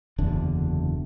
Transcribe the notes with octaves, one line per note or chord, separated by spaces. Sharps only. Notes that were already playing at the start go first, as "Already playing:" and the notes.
F#1 E2 D3 D4